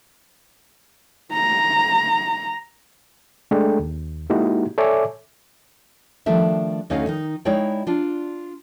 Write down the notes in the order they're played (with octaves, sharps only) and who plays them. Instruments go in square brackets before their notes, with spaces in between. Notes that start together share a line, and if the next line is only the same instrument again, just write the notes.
[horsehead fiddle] A#5
[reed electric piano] G#3 A3 D4 A4 G5
D#2
G#3 A#3 D#4 E4 F#4 G4
A4 C#5 D5 E5 G#5 D6
[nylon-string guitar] D#3 F3 G3 A3 D4 E5
D2 A3 C#4 D#4 D#5 F5
D#3 D#4
G#3 D#4 E4 C#5 D5 G5
D4 F4